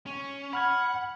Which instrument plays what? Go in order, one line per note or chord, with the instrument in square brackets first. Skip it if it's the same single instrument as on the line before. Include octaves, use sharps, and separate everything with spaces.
[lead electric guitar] C#4
[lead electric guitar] F#5 [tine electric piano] B5 F6 G#6